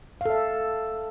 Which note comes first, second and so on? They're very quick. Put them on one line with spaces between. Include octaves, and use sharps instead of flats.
F5 A4 E5